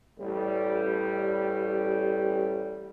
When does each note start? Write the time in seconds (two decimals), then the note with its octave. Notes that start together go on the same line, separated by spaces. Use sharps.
0.19 A1 G3